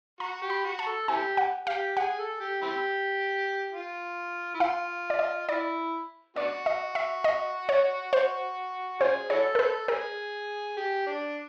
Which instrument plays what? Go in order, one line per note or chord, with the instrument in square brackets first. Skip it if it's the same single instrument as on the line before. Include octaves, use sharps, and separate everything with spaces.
[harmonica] F#4 [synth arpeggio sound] A#5
[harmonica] G4
[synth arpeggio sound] B5
[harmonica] F#4
[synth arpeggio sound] A5
[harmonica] A4
[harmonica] C4 E4 G4 [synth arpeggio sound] G#5
[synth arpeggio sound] F#5
[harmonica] G4 [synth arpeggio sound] F5
[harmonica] G#4 [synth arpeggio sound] F#5
[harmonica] A4
G4
C4 E4 G4
F4
E4
[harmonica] F4 [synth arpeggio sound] F5
[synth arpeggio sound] D5
D#5
[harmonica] E4 [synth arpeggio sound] D5
[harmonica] B3 D4 F#4 [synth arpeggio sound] D5
[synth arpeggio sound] D#5
E5
D#5
C#5
C5
[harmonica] C#4 F4 G#4 [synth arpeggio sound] C5
[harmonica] E4 F#4 A4 [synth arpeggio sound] C#5
[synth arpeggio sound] A#4
[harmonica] A4 [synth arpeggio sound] B4
[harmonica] G#4 [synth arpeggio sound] A#4
[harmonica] G4
D4